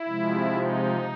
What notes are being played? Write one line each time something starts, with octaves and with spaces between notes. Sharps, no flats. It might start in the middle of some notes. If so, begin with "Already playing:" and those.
Already playing: E4
C3 F3 G#3
D#4